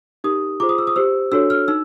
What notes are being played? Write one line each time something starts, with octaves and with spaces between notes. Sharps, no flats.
D#4 G4 A#4 D#6
F4 G#4 C5 D6
D#6
E6
D#6
G4 C5 E6
D4 F#4 A4 C#5 E6
F6
D#4 E6